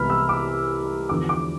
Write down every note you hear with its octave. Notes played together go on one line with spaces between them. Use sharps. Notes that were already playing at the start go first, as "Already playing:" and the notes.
Already playing: C2 E3 G#3 B3 B5 F6
E6
D6
E2 D3 F3 D6
D6